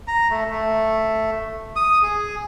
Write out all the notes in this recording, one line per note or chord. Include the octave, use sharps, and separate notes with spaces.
A#5
A3
A3
D#6
G#4